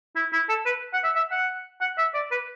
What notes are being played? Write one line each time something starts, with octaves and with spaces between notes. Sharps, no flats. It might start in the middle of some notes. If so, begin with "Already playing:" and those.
E4
E4
A4
B4
F#5
E5
E5
F#5
F#5
E5
D5
B4